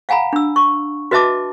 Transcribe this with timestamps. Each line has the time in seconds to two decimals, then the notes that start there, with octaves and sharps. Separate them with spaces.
0.09 F5 F#5 G#5 A#5 B5
0.33 D4 E6
0.56 C#6
1.11 F#4 B4 D#5 E5 A5 D6